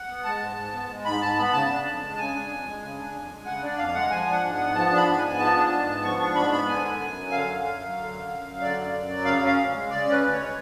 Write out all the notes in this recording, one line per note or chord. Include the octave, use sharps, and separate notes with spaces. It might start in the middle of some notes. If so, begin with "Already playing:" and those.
Already playing: F#5
B3
G#3 A5
G#2
G#2
B3
G#3
G#2 B5
G#2 A5
B3 B5
C#3 A5
D4
F2
G#3
C#3 G#5
D4
F2
G#3
C#3
D4
F2
G#3
C#3 F#5
D4 D5
F2 F5
G#3 F#5
F3 G#5
D4
F#5
G#2
B3 F#5
F3 A5
D4
B5
G#2
B3 G#5
F3 A5
D4
G#2
B3
F3 C#6
D4 C#6
G#2 B5
B3 B5
D3 G#5
F#2
F#2
F#3
D3 F5
F#2
F#2
F#3
D3
F#2
F#2
F#3
D3 D5
F#2
F#2
F#3
C#3 F5
C#4
F5
D2
G#3
C#3 D5
C#4
B4
D2
C#5
G#3